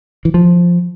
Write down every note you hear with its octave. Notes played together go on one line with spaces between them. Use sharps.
E3
F3